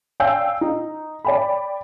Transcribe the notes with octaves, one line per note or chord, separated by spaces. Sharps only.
D5 F5 G5 G#5 E6 G6
D#4
D5 G5 B5